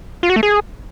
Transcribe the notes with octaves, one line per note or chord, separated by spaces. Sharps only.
F4
F#4
A3
G#4